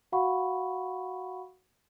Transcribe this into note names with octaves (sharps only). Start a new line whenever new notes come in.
F#4 F5 F#5 B5 C#6